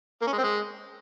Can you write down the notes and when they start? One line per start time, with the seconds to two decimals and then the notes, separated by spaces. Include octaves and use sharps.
0.21 A#3
0.27 C#4
0.33 G#3
0.38 C4
0.44 G#3